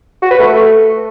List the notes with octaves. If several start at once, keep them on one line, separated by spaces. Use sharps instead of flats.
F#4
B4
A3